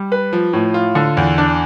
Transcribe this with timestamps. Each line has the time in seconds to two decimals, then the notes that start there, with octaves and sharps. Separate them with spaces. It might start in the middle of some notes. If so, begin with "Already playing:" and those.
Already playing: G3
0.12 B4
0.33 F3
0.53 A2
0.74 F4
0.95 D3
1.17 E2
1.38 D4